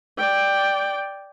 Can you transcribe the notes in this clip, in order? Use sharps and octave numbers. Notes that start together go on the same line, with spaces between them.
D5 G5